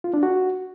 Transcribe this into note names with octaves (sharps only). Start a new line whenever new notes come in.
F4
D4
F#4